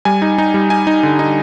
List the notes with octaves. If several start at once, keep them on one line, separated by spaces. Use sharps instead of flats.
G3 G#5
D#4
D#4
G3
D#4 G#5
D#4
D3
D#4